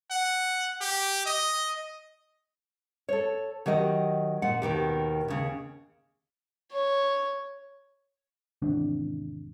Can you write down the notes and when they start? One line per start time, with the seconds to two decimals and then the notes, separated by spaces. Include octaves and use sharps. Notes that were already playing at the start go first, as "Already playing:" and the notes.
0.11 F#5
0.81 G4
1.26 D#5
3.09 A4 C#5
3.66 D#3 F#3 G4 D#5
4.42 A#2 F#5
4.62 D#2 B2 D#3 G4
5.28 D#2 C#3
6.72 C#5
8.62 G#1 E2 C3 D4